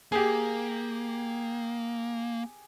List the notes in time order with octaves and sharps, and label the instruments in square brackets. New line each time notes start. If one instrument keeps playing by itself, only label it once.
[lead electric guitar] A#3 [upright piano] G4 G#4